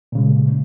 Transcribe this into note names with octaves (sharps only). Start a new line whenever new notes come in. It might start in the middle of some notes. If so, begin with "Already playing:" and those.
A#2 C#3 G#3